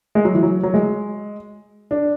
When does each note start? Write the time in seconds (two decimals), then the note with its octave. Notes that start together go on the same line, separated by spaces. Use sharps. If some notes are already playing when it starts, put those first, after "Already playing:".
0.15 G#3
0.25 F#3
0.34 E3
0.43 F#3
0.63 F#3
0.74 G#3
1.91 D4